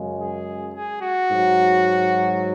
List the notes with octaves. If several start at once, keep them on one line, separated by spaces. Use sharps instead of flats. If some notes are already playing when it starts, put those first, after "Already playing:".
Already playing: F#2 C#3 G#3
G#4
G#4
F#4
G#2 F#3